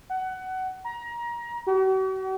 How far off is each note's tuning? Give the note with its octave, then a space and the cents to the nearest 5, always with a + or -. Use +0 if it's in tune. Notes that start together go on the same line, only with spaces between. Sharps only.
F#5 +20
A#5 +25
F#4 +45